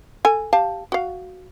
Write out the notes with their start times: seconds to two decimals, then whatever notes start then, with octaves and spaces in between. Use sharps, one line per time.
0.25 A4 G#5
0.53 G4 F5 A5
0.92 F#4 F5